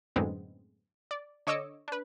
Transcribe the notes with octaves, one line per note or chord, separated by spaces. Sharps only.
F#2 A2 D3 G#3 B3 C4
D5
D3 C#5 D#5 D6 E6 C#7
D4 B4